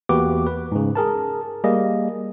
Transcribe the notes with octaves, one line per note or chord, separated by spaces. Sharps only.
E2 A#3 F#4 G4 B4 D6
B4
G#2 C#3
G#4 A#4 A5
G3 A#3 G#4 D#5